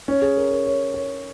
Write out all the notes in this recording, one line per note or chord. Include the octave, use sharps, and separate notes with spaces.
C#4
G#4
A#4
A#4
C#5
C#5